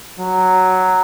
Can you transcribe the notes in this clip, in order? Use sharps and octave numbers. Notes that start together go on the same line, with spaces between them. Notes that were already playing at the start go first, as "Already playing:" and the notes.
F#3